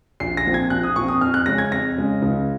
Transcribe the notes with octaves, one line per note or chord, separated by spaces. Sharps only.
A#1 C7
A#6
A#2 F3 C4
G#6
A#1 F#6
D#6
A#2 F3 C4 C#6
D#6
F2 F6
F#6
C#3 G#3 C#4 A#6
G#6
F2 A#6
C#3 G#3 C#4
C#2